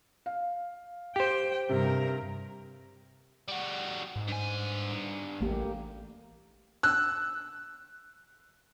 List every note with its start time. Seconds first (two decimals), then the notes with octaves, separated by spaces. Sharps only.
0.26 F5
1.16 G4 C5 G5
1.69 G2 C3 A#4
3.48 G3 F#4
4.16 G#2
4.28 G2 G#5
5.41 A1 A3 A#3 G4
6.83 E6 F#6